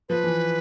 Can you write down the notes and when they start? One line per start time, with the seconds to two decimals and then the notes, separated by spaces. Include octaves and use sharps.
0.09 F3 B4
0.24 E3